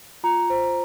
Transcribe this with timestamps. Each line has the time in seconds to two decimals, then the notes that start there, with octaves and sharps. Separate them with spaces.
0.24 F4 A#5
0.50 C5